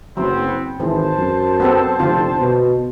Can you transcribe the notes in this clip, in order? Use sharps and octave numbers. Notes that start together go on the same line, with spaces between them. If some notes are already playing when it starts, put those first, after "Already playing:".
F#1 F#3 B3 C4
G#1 E3 C5 A5
F#2
B3 C4 A4
F1 D3 C4 F4
B2